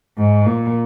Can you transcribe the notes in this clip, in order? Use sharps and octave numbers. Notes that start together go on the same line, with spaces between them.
G#2
A#2